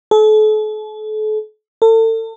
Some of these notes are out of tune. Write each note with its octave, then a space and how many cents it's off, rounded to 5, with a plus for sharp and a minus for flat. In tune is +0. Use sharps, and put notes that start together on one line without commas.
A4 -40
A4 +35